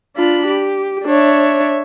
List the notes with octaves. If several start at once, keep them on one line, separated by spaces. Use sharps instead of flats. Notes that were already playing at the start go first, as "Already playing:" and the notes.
D4 F4 B5
G4
D4 C#5 E5